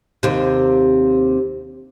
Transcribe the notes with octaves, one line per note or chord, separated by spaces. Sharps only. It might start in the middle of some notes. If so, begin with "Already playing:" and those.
D#2 C3